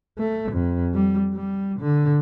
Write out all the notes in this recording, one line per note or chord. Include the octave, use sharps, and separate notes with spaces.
A3
F2
G3
G3
D3